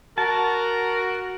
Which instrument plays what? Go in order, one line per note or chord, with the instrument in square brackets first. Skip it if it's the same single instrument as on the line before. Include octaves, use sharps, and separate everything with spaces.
[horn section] F#4 [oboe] A#4 [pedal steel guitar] A5